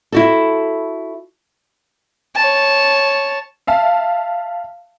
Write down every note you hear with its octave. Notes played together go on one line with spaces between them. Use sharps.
E4 F#4 A4
C#5 A5
E5 F5 A5